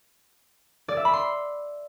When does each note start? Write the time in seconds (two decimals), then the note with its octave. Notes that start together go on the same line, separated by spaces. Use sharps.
0.88 D5
0.97 E5
1.05 B5
1.13 C6